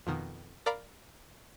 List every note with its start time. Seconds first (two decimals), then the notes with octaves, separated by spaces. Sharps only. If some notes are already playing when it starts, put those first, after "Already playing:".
0.07 F2 B2 D#3
0.66 A#4 D5 F5 A#5 B5